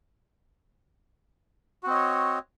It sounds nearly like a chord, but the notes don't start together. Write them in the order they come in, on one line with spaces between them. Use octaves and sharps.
F#4 C4 D#5 C#5